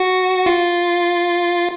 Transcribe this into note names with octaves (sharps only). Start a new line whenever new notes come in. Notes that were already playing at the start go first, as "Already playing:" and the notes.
Already playing: F#4
F4